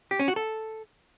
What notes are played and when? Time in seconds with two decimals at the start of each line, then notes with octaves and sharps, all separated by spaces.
0.11 G4
0.19 C#4
0.28 F#4
0.36 A4